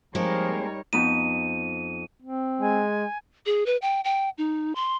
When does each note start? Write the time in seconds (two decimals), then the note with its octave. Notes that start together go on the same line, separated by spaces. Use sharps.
0.15 F3 G3 G#3 A#3 C4 D#4 A#4 C#5
0.93 F2 B3 D#4 D#7
2.22 C4
2.61 G#3 G#5
3.46 G#4
3.66 B4
3.82 G5
4.04 G5
4.38 D#4
4.75 C6